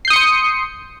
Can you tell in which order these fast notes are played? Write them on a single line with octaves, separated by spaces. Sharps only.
C7 G6 D#6 C#7 C6